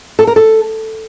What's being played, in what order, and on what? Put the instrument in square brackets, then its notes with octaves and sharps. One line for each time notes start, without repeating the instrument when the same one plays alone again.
[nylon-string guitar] A4
A#4
A4